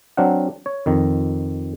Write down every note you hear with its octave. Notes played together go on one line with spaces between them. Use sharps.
F#3 C4 D4 F5 F#5
C#5
F2 D#3